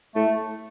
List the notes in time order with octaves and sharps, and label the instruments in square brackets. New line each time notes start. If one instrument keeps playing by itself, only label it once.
[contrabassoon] A2 [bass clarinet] A3